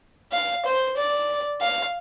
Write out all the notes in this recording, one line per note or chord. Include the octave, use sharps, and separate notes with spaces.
F5
C5
D5
F5